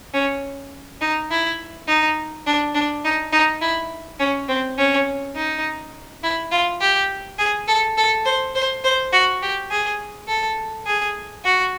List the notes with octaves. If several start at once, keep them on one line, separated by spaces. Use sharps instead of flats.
C#4
D#4
E4
D#4
D4
D4
D#4
D#4
E4
C#4
C4
C#4
D#4
E4
F4
G4
G#4
A4
A4
C5
C5
C5
F#4
G4
G#4
A4
G#4
F#4